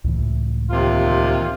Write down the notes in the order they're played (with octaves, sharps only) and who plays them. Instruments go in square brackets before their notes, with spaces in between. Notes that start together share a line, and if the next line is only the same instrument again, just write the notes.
[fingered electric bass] C#2 A2 E3
[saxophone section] D#2 C3 F4